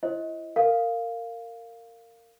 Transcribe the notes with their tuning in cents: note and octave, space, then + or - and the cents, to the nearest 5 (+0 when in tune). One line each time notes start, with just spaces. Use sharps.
E4 +30 C5 +35 D#5 +25
A#4 -25 F5 +0